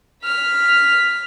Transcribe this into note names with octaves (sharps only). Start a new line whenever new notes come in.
F6 B6